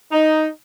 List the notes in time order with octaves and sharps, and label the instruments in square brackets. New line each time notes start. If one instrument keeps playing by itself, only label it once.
[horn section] D#4